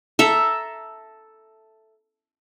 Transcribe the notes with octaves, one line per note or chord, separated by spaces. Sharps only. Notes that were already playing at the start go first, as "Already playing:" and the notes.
A4 E5 A#5